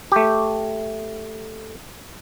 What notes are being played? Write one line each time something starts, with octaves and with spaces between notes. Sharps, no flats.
A3 G4